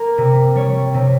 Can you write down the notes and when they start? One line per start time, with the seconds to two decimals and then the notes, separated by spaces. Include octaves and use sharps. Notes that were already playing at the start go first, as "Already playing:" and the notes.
Already playing: A#3 A#4
0.18 C3
0.55 G3 C#5
0.94 C3